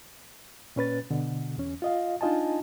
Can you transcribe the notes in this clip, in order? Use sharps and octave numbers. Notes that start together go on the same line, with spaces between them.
A#2 C#4 B4 A6
B2 D3
E2 C#4
F4 D#5 F5
D4 D#4 F4 D#5 G#5 A5